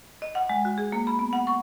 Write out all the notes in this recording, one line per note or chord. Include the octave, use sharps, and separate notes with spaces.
D#5
F#5
G#3
F#4
G#4
A#3
B5
B3
F#5
C#6